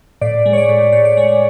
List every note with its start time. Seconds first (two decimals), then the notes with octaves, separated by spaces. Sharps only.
0.21 A2 D5
0.46 G#3
0.53 C#5
0.58 D5
0.69 A2
0.92 A2 C#5
1.05 D5
1.17 G#3 C#5